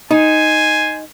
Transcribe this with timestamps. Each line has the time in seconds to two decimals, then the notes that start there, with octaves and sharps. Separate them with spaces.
0.11 D#4 C5 G#5